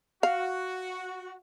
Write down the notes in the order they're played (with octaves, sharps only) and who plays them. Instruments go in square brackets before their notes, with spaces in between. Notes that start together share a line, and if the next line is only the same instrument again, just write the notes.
[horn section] F#4 [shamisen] F5